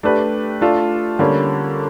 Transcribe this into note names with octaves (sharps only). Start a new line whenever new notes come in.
A3 D4 G4 B4
A3 D4 F4 A4
D3 G3 A#3 C#4